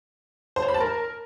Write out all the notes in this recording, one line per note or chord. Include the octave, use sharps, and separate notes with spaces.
C5
C#5
B5
A5
A#4